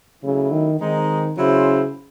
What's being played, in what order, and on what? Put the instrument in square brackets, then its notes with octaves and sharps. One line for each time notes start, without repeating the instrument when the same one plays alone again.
[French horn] C#3 [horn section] F#3 A3 C#4 E4
[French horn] D#3
[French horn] D#3 [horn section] G#3 C4 D#4
[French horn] C#3 [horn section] F#3 C#4 E4 C5